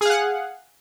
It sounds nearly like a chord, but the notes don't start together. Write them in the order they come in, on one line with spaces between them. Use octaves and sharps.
G#4 F5 F#5